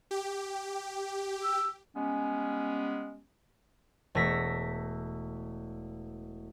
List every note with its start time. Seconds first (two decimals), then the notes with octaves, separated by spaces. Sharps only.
0.11 G4
1.43 E6
1.96 G3 G#3 B3 C#4
4.15 E1 A3 A#6 B6